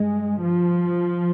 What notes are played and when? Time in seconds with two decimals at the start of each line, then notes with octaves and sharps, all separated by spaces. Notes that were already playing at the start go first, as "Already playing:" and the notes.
Already playing: G2 G#3
0.42 F3